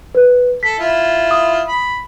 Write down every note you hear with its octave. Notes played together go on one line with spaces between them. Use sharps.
B4
A4 B6
E4 F4
D#6
B5